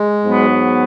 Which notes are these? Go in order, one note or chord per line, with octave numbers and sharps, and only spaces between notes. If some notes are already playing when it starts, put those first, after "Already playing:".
Already playing: G#3
G#2 F#3 B3